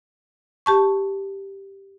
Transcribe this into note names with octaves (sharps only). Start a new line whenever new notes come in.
G4 A5 C#6